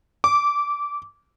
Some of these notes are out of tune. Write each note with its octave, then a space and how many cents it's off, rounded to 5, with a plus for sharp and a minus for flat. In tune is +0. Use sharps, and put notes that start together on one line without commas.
D6 -15